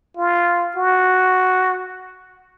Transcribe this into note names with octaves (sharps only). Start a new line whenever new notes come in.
F4
F#4